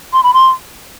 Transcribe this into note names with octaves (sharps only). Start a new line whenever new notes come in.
C6
B5
C6